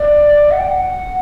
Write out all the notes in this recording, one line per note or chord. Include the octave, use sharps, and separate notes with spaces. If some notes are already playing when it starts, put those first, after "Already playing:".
Already playing: D5
F#5
G5
F#5